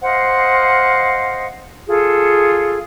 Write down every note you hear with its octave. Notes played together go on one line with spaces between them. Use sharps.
C5 D#5 F5 F#5
F4 G#4 A4